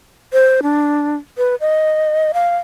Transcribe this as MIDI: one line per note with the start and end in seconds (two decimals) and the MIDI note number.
0.33 0.60 72
0.63 1.15 62
1.38 1.55 71
1.61 2.32 75
2.34 2.57 77